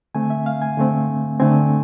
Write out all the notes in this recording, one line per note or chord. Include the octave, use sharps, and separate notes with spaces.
D3 A3 C4 G#5
E5
F5
G#5
D3 A3 C4
D3 A3 C4 G#5